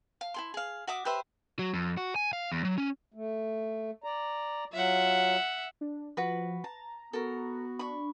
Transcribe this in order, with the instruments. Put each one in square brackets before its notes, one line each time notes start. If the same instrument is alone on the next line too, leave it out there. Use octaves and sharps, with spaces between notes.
[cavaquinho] F5
E4 G#4 C6
G#4 F5
F#4 E5 D6 D#6
G4 B4 C5 E5
[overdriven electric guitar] F#3
F2
F#4
G#5
F5
E2
F#3
C#4
[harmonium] A3
D5 A#5
[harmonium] F#3 F4 [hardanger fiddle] E5 F#5
[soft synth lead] D4
[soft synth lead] F3 [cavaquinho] F#4 B4
[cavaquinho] A5 [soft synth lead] A#5
[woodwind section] B3 F#4 [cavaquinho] A4 A#4
[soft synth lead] D4 [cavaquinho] B5 C#6